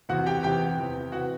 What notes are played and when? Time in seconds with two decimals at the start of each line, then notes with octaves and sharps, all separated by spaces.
0.09 E2 C3 E3 F#4 F#5
0.26 G4 G5
0.43 E2 C3 E3 G4 G5
0.78 E2 C3 E3
1.12 C3 E3 F#4 F#5